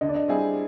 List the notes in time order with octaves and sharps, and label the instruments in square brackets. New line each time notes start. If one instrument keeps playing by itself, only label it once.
[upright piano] D3 [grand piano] D#5
[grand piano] D5
D#5
[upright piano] G3 C4 E4 G#4